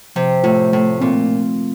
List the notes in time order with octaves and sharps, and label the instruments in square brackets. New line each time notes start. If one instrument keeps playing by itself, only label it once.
[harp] C3 [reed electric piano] F3
[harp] A2 [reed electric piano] F4
[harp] A2 [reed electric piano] A3
[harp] A#2 [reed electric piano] C4